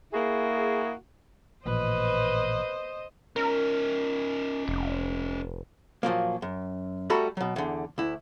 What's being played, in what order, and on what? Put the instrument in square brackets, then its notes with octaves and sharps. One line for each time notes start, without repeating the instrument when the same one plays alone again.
[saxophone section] A#3 E4 F#4 G#4
[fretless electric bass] A1 A#2 F3 [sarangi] B4 [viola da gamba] C5 D#5
[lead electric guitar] C#4 D#4 [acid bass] A#4
[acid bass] F1
[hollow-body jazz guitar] A#2 F3 F#3 A#3
F#2
G3 A3 F#4 A4 A#5 B5
B2 F#3
E2 D3
D2 E4